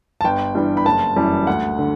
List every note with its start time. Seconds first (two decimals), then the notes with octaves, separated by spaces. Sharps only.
0.21 A5
0.24 G1 G5
0.55 G2 E3 G3
0.77 B5
0.85 F#1 A5
1.16 F#2 E3 G3
1.47 D2 F#5
1.79 D3